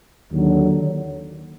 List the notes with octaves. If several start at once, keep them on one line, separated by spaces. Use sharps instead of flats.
D#2 D3 F#3